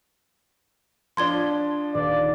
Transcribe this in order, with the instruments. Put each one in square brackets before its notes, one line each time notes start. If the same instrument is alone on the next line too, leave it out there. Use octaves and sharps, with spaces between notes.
[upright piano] F3 D4 [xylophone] C6 G#6 G7
[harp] D#1 [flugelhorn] D5